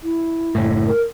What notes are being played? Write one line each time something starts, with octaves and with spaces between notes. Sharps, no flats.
E4
F#1 A2
A#4